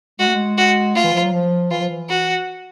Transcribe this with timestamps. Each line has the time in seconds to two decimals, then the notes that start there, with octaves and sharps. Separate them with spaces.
0.19 G#3 F#4
0.27 A3
0.35 G#3
0.58 F#4
0.95 A3 F4
1.04 E3
1.14 F3
1.23 F#3
1.33 F3
1.71 E3 F4
1.80 F3
1.89 E3
2.09 F#4